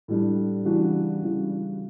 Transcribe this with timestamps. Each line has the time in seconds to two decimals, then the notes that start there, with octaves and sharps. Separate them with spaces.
0.08 A2 G3 D4
0.65 C#3 E3 G3 D4 F#4
1.22 C#3 E3 G3 D4 F#4